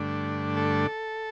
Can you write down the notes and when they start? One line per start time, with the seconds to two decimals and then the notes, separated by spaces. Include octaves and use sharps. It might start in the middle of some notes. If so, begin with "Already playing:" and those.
Already playing: G2 D3 A3 D4
0.57 A4